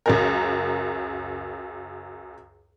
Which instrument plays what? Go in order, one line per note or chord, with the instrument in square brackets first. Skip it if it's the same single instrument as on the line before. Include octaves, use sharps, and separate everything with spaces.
[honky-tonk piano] C#2 F#2 A#4